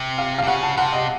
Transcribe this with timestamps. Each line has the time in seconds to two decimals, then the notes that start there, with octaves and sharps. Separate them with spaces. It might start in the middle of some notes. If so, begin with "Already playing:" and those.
Already playing: C3
0.18 F5
0.38 F5
0.43 C3
0.47 C#3 F#5
0.63 A5
0.77 C3 F#5
0.93 D#5